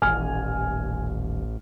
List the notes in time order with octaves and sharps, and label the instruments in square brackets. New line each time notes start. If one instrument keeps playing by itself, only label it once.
[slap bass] D#1 D#2 [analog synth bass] A1 [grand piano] G#5 F6